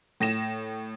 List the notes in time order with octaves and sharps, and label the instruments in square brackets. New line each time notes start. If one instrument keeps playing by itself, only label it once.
[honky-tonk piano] A2 A#6 E7